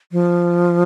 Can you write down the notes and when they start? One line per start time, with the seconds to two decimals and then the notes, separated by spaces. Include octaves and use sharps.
0.12 F3